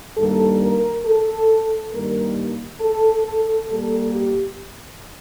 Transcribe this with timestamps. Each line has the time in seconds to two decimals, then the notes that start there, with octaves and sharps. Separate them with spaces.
0.17 G2 D#3 G3 A#3 A4
0.61 A#4
1.05 A4
1.92 G2 D#3 G3 A#3 A#4
2.80 A4
3.24 A4
3.68 A#2 G3 A#3 A4
4.12 G4